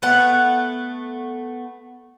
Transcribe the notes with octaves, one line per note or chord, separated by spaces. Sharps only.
A3 B3 F#5